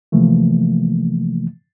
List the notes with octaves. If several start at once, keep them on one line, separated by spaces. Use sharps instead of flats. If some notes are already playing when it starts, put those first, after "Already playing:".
C3 E3 F3 A3 A#3